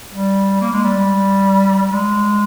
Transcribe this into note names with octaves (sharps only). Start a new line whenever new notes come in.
G3
A#3
G#3
G3
G3
G#3